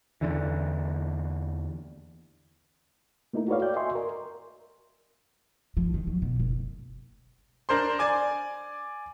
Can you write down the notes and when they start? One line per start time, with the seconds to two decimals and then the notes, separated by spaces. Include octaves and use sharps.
0.21 E2 D3 E3
3.33 A3 A#3 D#4 E4 A#4
3.48 F#4 A4 B4 C#5 D5 F5
3.62 D5 G5 G6
3.76 F#4 D#5 E5 G#5 C6 C#6
3.95 A#4
5.77 F3
5.94 D#3
6.07 F#3
6.22 B2
6.40 F#1
7.69 D4 A#4 C5 C6
7.99 D5 G#5 D6